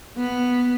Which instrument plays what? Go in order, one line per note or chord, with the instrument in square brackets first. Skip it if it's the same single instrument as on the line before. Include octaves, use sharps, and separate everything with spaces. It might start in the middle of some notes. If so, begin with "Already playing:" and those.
[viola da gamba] B3